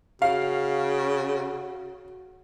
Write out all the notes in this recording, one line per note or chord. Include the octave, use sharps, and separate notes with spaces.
C#3 F#4 F5